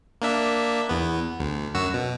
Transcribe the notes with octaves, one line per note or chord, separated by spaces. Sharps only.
A#3 D4 E5
E2 B3
D2
F#2 F#4 E6
B2